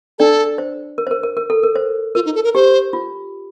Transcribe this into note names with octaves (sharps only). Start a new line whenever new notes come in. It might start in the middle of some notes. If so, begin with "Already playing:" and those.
D4 A4 D5
C5
A#4
C5
A#4
A#4
A#4
A4
A#4
C5
F4 A#4
D#4
A4
A#4
G4 C5
F4